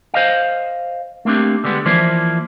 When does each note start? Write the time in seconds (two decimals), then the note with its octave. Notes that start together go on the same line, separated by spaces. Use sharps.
0.14 C5 D#5 F5
1.25 A3 A#3 C4 D4 G4
1.64 D3 G3 G#3 B3
1.86 E3 F3 A#3 E4 C5 D5